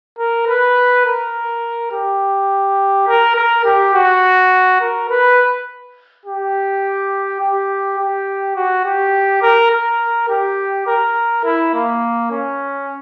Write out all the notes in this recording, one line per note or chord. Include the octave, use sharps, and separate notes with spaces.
A#4
B4
A#4
G4
A#4
A#4
G4
F#4
A#4
B4
G4
G4
G4
F#4
G4
A#4
A#4
G4
A#4
E4
A#3
C#4